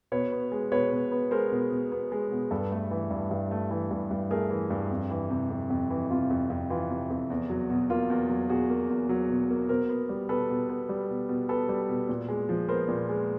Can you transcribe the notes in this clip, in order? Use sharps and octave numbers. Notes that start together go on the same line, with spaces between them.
B2 B4 C#5
B3
G#3
B2 B4 C#5
B2
B3
G#3 A#4 C5
B2
B2
B3
G#3
B2
G2 A4 B4
A3
E3
G2
G2
A3
E3
G2
G2
A3 G#4 A#4
E3
G2
F2
E3
C3
F2
F2
E3
C3 F4
F2
F2
E3 F4
C3
F2
E2
F#3
B2
A#3 F4
E2
F#3
B2 F#4 G#4
A#3
E2
F#3
B2
A#3
B2 A#4 C5
B3
G3
B2 A4 B4
B2
B3
G3
B2
B2
B3 A4 B4
G3
B2
A#2
G#3
F3
B3 A#4 C5
A#2
G#3